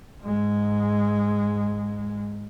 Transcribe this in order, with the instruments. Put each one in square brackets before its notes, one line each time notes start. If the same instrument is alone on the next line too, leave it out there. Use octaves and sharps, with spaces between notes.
[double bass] G#2 G#3